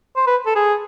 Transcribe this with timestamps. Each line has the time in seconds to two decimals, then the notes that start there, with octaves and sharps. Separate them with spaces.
0.16 C5
0.27 B4
0.46 A4
0.55 G#4